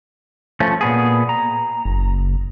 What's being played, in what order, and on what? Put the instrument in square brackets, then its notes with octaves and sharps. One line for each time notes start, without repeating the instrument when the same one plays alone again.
[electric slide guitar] F3 A3 C#4
A#2 B3 G#4
A#5
[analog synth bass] F#1